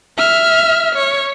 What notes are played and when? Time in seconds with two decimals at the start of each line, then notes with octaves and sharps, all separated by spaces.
0.18 E5 F6
0.95 C#5